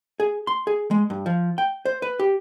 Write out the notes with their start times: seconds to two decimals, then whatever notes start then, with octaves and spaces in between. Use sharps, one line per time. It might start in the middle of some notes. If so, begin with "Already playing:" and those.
0.20 G#4
0.47 C6
0.67 G#4
0.91 G#3
1.10 G2
1.26 F3
1.58 G5
1.85 C5
2.02 B4
2.19 G4